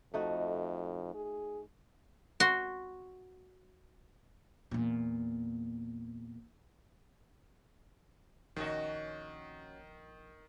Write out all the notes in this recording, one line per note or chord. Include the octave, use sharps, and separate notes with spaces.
F2 A3 D#4 F#4
G#4
F#4 C6
E2 A#2
A#1 D#3 C#4 F#4 D#5